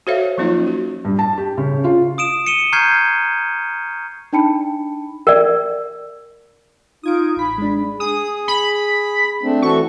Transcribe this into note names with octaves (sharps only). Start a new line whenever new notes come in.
F#4 A4 C5 C#5 E5 F5
F3 F#3 A#3 C#4 D#4 F4
F#4
G2
A5
G4
C#3
F4
D#6 D7 E7
C#7 D#7 E7 G7
A#5 C#6 F6 G6 G#6 C7
D4 D#4 G5 A5 B5 C#7
A#4 D5
D#4 F4 D#6 G#6 D7
A1 B5 B6
G#3 D4
G#4 D#6
B5
A3 C4 D4
E3 F#4 A4 C#6